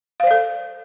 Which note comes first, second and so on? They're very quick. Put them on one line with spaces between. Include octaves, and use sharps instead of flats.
F5 C5 D5 A4